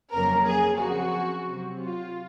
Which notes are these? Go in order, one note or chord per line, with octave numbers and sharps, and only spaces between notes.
F2 C#3 F#3 A#3 A#4
G#4
C#3 F3 C4 F#4
C3 F#3 C4
F4